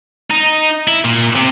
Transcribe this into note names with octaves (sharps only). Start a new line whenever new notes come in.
D#4
E4
A#2
C3